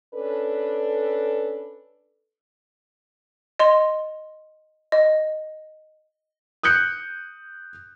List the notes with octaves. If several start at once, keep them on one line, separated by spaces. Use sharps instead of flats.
C#4 D4 A4 B4
D#5 C6
D#5
D#6 F#6 G6 C#7